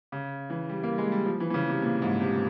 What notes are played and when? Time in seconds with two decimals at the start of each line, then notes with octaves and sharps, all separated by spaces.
0.12 C#3
0.50 E3
0.69 G3
0.83 A#3
0.92 G3
0.98 G#3
1.12 G3
1.25 F3
1.40 E3
1.50 E3
1.54 C#3
1.69 C3
1.82 A#2
2.02 G#2
2.20 C3